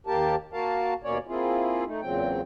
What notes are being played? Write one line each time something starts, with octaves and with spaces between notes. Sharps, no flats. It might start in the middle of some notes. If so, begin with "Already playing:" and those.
D#2 A#3 G4 A#4 A5
A#3 F#4 A#4 F5 A5
D#2 B2 A#3 C#4 C#5 D5
A#3 C4 E4 F4 G#4
A3 D#4
E2 A#2 C#3 F#3 C4 G5